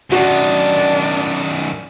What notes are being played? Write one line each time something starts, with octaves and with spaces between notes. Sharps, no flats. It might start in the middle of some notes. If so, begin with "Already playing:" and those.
F#2 D#3 D4 F#4